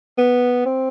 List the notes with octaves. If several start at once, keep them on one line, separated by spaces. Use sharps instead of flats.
B3
C4